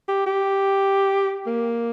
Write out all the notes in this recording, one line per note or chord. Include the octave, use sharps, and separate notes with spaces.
G4
G4
A#3